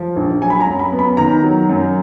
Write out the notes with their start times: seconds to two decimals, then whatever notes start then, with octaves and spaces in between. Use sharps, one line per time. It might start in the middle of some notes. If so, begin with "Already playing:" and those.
Already playing: F3
0.16 A#1
0.41 F#3 G#5
0.50 B5
0.60 A#5
0.67 F#2
0.79 B5
0.92 B3
0.99 B5
1.17 D#3 A#5
1.43 F#3
1.69 F#2